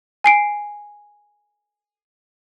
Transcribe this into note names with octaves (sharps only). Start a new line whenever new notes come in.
G#5 C7 D7